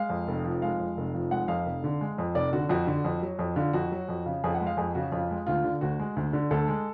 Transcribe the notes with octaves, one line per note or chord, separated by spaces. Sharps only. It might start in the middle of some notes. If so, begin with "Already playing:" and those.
Already playing: G#3 F5
F2
F1
F3
G#3 F5
F2
F1
F3
G#3 F#5
F2 F5
F1
D3
G#3
F2
F1 D5
D3 F#4
F2 F#4
D3
F2
F#3
F2
D3 F4
F2 F#4
F#3
F2
C#3
F2 G#4
F#5
G#3
F5
F2 G#4
C#3 F#4
F2 F4
G#3
D2 F4
D3
D2 F#4
G#3
D2
D3
D2 A4
G#3